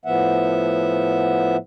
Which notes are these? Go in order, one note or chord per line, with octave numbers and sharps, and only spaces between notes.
A2 F3 B3 E5 F#5